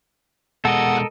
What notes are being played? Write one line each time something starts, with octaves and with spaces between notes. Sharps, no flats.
B2 G#3 A4 A#4 D#5 F#5